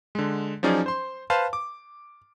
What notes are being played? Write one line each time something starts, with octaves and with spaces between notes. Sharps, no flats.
D3 G#3
F3 F#3 C#4 D#4 G#4 D5
C5 C6
B4 C5 F5 A5
D6